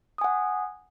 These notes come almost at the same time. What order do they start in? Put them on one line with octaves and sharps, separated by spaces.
D#6 G#5 F#5